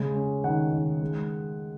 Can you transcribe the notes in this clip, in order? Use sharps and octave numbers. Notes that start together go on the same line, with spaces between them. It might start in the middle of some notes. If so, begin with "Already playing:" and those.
Already playing: C#3 G#3
C#4
D#3 F#5
D#3
G#3